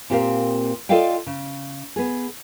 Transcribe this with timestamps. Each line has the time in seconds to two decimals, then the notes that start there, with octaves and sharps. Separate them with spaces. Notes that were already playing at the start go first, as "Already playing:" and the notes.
0.10 A#2 C4 G4 A#4 F5
0.89 F4 A4 D5 D#5 F5 G5
1.26 C#3
1.96 B3 G#4